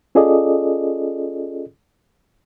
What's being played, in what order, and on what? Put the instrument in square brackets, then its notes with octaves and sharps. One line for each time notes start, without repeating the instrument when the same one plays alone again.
[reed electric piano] C#4 F4 G#4 A4 D5 D#5